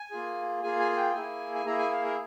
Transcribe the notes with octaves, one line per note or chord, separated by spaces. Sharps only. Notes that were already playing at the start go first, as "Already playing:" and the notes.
Already playing: G#5
A#3 F4 G#4
A#3 F4 G#4 G#5
G#5
G#5
G5
G5
A#3 E4 G#4 G#5
G#5
A#3 E4 G#4 A#5
G#5
F5
A#4